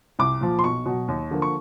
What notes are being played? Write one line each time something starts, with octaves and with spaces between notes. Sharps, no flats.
C2 D6
A#2 F3
C6
B1 C#6
B2 F#3
D#2
D3 F3 A#3
C#6